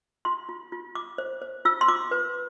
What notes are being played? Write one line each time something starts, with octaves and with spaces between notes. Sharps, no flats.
F4 C6
F4
F4
F4 D6
C5
C5
F4 E6
C6
F4 D6
B4